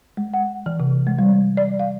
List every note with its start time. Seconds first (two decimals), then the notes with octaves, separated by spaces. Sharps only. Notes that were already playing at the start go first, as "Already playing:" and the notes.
0.17 G#3
0.34 F#5
0.66 E3
0.80 C3
1.07 G#3
1.19 G3
1.57 D5
1.79 F5